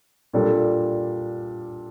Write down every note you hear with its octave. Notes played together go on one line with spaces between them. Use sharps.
A#2 G3 D4 A4